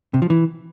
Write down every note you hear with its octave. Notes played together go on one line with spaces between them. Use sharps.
C3
F3
E3